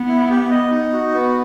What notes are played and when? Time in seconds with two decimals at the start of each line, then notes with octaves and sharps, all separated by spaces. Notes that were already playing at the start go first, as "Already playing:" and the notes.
Already playing: B3
0.08 E4
0.30 G4
0.50 D#5
0.71 D#4
0.92 F#4
1.13 B3